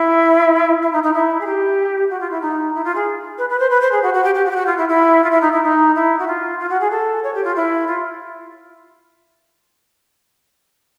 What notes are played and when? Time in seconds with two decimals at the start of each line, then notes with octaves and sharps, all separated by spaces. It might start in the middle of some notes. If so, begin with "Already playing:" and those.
Already playing: E4
0.82 E4
0.92 D#4
1.03 D#4
1.13 E4
1.40 G#4
1.46 G4
2.10 F#4
2.20 F4
2.31 E4
2.41 D#4
2.74 E4
2.84 F4
2.95 G#4
3.38 B4
3.49 B4
3.59 C5
3.70 B4
3.81 C5
3.91 G#4
4.02 F#4
4.13 F#4
4.24 G4
4.34 G4
4.45 F#4
4.50 G4
4.55 F#4
4.66 F4
4.77 E4
4.88 E4
5.24 F4
5.31 E4
5.41 D#4
5.52 E4
5.63 D#4
5.95 E4
6.18 F#4
6.27 F4
6.59 F4
6.69 F#4
6.80 G#4
6.90 A4
7.23 C#5
7.34 G4
7.44 F4
7.55 E4
7.87 F4